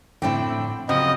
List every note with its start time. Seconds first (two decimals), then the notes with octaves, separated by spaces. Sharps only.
0.22 A2 D3 C4 D4 E4 G5
0.89 C#3 F3 F#3 C4 D#5